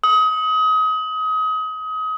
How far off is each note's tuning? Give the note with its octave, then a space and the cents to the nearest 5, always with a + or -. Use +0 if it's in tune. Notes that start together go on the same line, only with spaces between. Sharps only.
D#6 +30